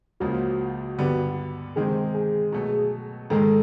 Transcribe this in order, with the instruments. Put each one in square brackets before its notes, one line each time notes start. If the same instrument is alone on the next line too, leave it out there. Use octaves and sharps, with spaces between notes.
[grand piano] C#2 C#3 F3 A#3 [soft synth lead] F#4
[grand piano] G2 D3 G3 B3
[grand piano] C3 D#3 G#3 C4 [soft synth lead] G#4
[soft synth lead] G#4
[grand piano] B2 F#3 A3
[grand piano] G#2 D#3 G#3 [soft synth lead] A4